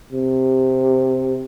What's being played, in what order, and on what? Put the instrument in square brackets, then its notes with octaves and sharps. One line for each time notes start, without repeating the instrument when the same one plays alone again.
[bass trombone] C3